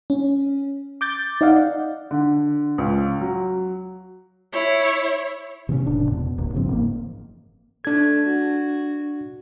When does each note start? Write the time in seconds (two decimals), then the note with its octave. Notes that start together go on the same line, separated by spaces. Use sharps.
0.10 C#4
1.01 D6 G6 A6
1.41 D#4 D5 D#5 F5 F#5
2.11 D3
2.78 C#2
3.21 F#3
4.53 E4 C#5
5.69 C3 E3 A3 C#4
5.86 F1 A2 C#3 D4
6.12 E2 B2
6.38 D1 G#1 D#2
6.54 G2 C#3 F3 C4
6.69 F#1 G#2 E3 A#3
7.85 A3 D4 G#6
8.26 F#4